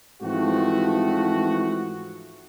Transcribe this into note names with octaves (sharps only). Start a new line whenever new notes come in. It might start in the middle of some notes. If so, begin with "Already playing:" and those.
G#2 E3 F3 A3 C4 F#4